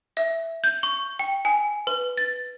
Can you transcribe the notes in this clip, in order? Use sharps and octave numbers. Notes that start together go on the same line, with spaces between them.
E5
G6
C#6
G5
G#5
B4
A6